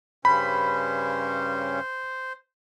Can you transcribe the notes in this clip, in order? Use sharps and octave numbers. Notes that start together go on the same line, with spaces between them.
G2 C#3 C#4 C5 B5